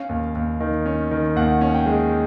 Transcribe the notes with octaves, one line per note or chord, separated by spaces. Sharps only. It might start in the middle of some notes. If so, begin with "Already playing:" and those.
Already playing: C#4 F5
D#2
D#2
D#3
C#4
D#3
D#2 F#5
C#4
G5
G#3